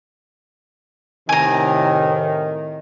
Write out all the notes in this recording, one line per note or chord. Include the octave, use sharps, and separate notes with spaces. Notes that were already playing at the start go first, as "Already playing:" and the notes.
A2 C3 D#3 G#5 A#5